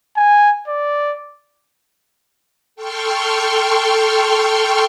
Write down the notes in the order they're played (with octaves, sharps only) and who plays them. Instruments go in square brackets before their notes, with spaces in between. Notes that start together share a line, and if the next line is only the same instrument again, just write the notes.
[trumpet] G#5
D5
[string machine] A4 G5 C6 C#6 F6